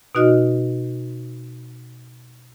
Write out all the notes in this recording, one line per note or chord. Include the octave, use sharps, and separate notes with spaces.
B2 D#4 F#4 D#5 F6